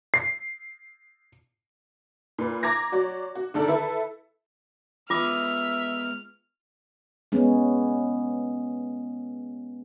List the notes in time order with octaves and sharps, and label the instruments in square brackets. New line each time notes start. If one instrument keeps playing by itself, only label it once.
[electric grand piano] C7
[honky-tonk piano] A#2 B4
A#5 D6 G#6 A#6
F#3 F#4 C#5 D5
F#4
D3 D#3 A4 A#4 D5
E4 A4 B4 E5
[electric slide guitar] G#3 B3 [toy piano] F4 D6 [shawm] E5 [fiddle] F6
[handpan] G#3 B3 C#4